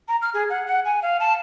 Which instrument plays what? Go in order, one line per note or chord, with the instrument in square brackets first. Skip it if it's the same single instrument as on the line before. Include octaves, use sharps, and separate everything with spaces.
[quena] A#5
F6
G#4
F#5
F#5
G#5
F5
A5